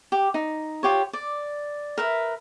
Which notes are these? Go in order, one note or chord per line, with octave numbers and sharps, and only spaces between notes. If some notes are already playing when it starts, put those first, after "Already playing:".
G4
D#4
F4 G4 C#5
D5
A#4 B4 E5